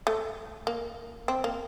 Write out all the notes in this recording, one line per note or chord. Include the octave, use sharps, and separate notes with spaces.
A3
A#3
C4
A#3